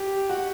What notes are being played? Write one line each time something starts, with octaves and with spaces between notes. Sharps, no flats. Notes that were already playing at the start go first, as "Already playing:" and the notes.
Already playing: G4
F#4